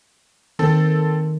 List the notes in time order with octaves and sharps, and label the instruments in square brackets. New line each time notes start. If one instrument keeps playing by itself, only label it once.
[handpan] D#3 [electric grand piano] C4 A4 A5